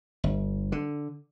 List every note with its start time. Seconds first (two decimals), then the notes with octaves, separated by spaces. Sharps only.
0.24 G1
0.72 D3